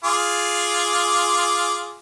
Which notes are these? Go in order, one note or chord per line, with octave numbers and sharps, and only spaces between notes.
F4 G#4 D6